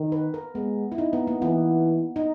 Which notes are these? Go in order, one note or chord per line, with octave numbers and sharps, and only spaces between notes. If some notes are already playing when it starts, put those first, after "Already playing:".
Already playing: D#3
B4
A#4
G#3 B3
E4
D#4
B3
A#3
E3 B3
D#4